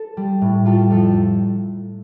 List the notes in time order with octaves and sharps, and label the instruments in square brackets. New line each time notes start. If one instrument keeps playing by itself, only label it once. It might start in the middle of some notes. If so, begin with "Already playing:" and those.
Already playing: [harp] A4
G3
A2
G3 F4 A4
F2 F4 A4